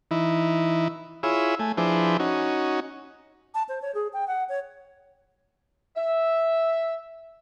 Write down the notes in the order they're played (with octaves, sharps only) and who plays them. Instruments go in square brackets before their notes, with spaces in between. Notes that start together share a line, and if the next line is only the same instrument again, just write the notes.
[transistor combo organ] E3 D#4 E4
E4 F4 G#4 C#5 B5 E6
A3 G#5
F3 D4 E4 G#4 B4 C5
C#4 D#4 F#4
[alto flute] A5
C5
C#5
G#4
G5
F#5
C#5
[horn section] E5